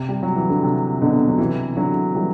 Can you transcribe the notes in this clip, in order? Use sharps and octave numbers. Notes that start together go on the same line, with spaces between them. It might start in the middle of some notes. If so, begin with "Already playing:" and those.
Already playing: C3
G3
F#3
E3
D3
C3
B2 D3
F#3
C3 E3
D3 F#3
E3 G3